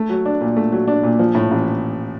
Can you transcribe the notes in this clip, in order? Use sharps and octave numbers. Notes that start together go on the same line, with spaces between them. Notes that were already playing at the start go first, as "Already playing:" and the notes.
Already playing: A3
F#3
D4
A#2
A3
F#3
D4
A#2
F3
A2
A1